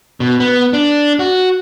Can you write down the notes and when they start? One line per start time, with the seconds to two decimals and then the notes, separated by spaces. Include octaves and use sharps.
0.20 B2
0.40 B3
0.73 D4
1.19 F#4